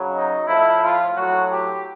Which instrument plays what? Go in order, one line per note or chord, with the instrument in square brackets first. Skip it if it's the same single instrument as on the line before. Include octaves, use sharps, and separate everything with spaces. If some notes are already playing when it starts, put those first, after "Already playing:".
Already playing: [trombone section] C#3 F#3
D#4
A2 F3 E4
F4
A2 F#3 F#4
G4